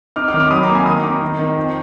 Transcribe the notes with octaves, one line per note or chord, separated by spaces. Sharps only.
D#4 D6 F6
D6 F6
D#3
D6 F6
F#3 B5 D#6
A#5 D6
A#3
G#5 B5
D#3 B5 D#6
D#4 A#5 D6
D#3
D#3
F2